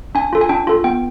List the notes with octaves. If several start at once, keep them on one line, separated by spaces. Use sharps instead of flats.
D4 G#5
F4 A4
G#5
D4 G5
F4 A4
B3 G5